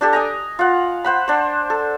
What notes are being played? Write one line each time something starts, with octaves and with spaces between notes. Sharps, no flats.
D4 G4 A4
D#5 G#5 A#5
F4 F#5
C5 F#5 B5
D4 C5
A4